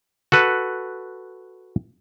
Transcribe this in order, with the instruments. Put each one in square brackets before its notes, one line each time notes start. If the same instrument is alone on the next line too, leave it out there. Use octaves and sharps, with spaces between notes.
[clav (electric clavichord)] F#4 A4 B4